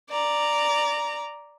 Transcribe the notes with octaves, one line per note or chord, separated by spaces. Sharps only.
D5 A#5